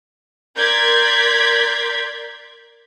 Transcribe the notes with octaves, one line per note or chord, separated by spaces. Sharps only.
A#4 D5 C6 G6 G#6 B6